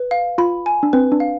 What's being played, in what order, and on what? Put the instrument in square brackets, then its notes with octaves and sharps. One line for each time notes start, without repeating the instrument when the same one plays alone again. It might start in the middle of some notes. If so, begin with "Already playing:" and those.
Already playing: [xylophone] B4
F5
[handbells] F4 [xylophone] B5
[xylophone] G#5
[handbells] D4
[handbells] C4 [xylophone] B4
[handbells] D4
[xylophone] F5